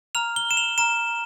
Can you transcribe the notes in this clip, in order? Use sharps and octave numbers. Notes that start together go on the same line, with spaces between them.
A#5 F6 F7
G7
E7
F7
A#5 F6 E7